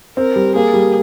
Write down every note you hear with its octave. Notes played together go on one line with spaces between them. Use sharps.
C4 A#4
G3
A#3 G#4
G3